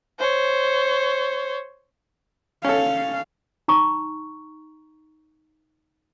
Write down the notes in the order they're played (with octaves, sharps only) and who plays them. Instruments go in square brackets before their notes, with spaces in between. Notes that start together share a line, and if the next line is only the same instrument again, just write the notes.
[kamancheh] C5 C#5
[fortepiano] C#4 A4 [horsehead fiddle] F5
[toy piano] D#4 A#5 C#6